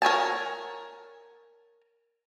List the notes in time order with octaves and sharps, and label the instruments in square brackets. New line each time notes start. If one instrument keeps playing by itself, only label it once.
[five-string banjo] A#4 C#5 G#5 A5